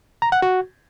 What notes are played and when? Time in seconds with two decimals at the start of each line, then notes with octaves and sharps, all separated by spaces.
0.22 A#5
0.32 F#5
0.42 F#4